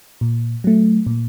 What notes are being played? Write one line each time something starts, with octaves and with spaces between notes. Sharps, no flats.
A#2
F#3 A3
A#2